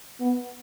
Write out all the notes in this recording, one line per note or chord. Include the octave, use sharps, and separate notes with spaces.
B3